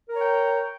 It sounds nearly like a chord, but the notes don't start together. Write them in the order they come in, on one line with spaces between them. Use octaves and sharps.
A#4 A#5 C#5 G5